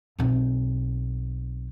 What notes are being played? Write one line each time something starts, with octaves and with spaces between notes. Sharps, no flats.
B1 C4